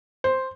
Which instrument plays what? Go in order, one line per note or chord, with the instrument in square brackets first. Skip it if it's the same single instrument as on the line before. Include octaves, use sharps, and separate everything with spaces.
[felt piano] C5